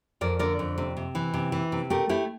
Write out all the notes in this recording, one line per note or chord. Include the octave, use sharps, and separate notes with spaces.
F2 A#4 D5
D3 A#4 D5
F2
C3
C3
E3
C3
E3
C3
A3 G4 A#4
A3 E4 G4